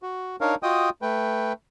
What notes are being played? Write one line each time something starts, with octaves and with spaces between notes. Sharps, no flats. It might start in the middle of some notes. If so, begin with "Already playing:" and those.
F#4
D4 D#4 A#4 C#5 F5
F4 F#4 D#5 G5 D#6
A3 B4 G5